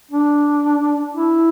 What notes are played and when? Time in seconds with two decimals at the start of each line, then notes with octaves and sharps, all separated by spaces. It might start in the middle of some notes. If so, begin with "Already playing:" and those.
0.12 D4
1.13 E4